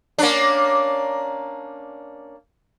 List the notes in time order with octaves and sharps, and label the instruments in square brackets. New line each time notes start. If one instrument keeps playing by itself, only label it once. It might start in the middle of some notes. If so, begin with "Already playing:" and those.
[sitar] A#3 C#4 D4